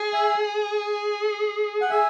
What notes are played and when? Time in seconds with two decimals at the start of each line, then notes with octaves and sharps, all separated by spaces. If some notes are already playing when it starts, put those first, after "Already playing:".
Already playing: G#4
0.13 E5 G#5
1.81 F#5
1.90 E5 G#5